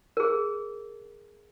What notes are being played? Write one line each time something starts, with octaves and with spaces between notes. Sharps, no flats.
G#4 A#4